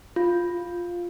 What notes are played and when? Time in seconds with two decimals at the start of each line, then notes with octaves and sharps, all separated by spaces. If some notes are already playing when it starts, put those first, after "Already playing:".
0.16 F4